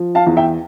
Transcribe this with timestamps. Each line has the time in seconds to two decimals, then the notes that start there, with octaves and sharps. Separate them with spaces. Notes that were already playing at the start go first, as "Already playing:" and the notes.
Already playing: F3
0.15 F5 A5
0.27 E2
0.37 E5 G5